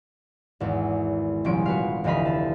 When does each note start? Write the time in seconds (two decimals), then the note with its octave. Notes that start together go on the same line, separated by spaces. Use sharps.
0.60 G#1 E2
1.44 D#1 C2 F3 C#4 D7
1.66 F#4 B4 F5
2.04 F1 D2 E3 D#5 F5 B5
2.25 A5